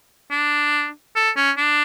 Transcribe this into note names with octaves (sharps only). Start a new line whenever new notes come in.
D4
A4
C#4
D4